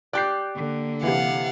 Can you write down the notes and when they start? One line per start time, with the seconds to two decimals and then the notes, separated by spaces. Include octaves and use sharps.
0.13 G4 D5 F#6 G6 C7
0.56 D3 A#3
1.03 C3 E3 F5 F#5